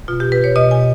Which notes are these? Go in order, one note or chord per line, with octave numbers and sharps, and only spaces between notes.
B2 F4
G4
B4
C#5
B2 D#5
G#5